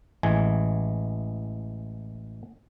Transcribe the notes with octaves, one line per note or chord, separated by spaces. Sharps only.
A1 E3 G#3 G#5